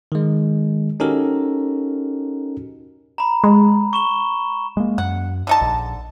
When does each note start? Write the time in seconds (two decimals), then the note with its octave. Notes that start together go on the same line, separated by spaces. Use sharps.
0.12 D#3 G#3
1.00 C#4 D#4 F#4 G4 A4 A#4
3.18 A#5 B5
3.44 G#3
3.93 C#6 E7 G7
4.77 G#3 A#3
4.98 F#2 F#5
5.47 D3 D#4 A5
5.61 A#1